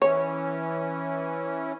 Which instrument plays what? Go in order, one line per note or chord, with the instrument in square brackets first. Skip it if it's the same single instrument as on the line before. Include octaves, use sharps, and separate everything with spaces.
[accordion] E3 C#4 [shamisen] C#5